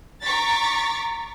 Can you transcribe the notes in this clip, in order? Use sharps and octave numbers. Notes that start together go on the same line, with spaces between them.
A#5 C#6 D6 A6 B6